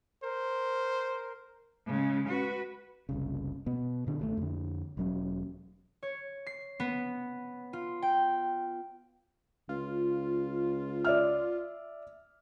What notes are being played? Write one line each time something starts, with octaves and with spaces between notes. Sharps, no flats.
A#4 C5
C#3 G#3
F#4 B4
F#1 C2 C#3
B2 B3
A#2 D3 D4
G#1 B2 A3
F2 D3
E1 F#3 C#4
C#5
C7
B3
F4
G5
C#2 F4
D5 E5 F6